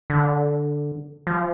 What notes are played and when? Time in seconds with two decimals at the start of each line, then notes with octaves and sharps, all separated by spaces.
0.10 D3
1.27 F3